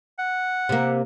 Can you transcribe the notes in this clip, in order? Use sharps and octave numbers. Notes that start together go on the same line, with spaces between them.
F#5
C3 A#3